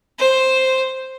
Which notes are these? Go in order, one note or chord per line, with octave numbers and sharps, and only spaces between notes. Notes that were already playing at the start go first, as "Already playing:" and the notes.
C5